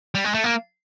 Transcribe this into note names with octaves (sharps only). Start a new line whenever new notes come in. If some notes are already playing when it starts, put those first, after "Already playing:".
G3
G#3
A3
A#3